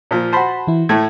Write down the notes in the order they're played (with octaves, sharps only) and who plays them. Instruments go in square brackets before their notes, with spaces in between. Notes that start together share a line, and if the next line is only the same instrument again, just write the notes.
[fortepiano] A#2 F3
[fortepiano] F#4 C5 [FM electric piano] A5 B5
[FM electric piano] E3 E4
[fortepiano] A2 A3 [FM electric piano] G#6